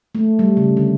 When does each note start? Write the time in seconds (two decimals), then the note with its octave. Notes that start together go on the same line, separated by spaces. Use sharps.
0.15 A3
0.39 G3
0.57 C#3
0.77 D3